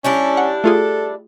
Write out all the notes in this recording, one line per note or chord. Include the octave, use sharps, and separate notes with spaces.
G3 C#4 D4 E4
F#5
A3 F4 G#4 A4